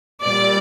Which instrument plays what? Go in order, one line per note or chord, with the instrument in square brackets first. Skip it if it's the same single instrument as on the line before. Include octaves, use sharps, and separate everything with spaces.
[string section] A#2 G3 D5